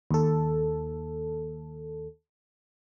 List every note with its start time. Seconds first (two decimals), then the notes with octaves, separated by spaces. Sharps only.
0.11 D#2 A4